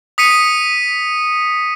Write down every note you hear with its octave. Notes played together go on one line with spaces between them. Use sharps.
D#6 B6 C#7 D#7